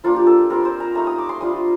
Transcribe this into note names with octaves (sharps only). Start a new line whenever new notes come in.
F3 A#3 D4 F4
G4
A4
G3 C4 F4 A#4
C5
A#5
A3 D#4 A#5
D#6
D6
C6
G3 D4 F4 D#6